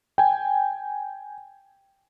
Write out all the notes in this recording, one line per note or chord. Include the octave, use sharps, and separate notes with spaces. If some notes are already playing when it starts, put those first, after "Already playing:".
G5 G#5